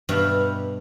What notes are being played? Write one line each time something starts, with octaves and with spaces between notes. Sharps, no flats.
G2 B2 G3 E5 F5